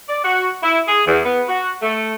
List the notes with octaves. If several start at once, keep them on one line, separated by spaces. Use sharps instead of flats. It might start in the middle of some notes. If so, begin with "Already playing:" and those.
D5
F#4
E4
G#4
E2
B3
F#4
A3